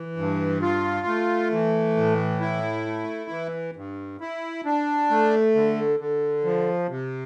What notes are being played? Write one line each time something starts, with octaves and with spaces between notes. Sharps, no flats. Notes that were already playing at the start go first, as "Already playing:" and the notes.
Already playing: E3
G2
F4
A3
E3
A2
E4
A3
E3
G2
E4
D4
A3
D3
D3
F3
C3